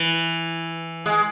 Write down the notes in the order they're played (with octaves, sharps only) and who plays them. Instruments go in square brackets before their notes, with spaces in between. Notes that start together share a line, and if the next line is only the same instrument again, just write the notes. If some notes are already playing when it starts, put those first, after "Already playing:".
Already playing: [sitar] E3
G#3